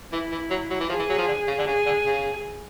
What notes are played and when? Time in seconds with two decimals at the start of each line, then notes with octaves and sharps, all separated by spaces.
0.13 E3 E4
0.31 E3
0.50 F#3
0.70 F#3
0.80 E3
0.89 F3 G#4
0.99 E3
1.09 F#3
1.18 F3
1.28 D3
1.48 C#3
1.58 D3
1.67 C#3 G#4
1.86 D3
2.06 C#3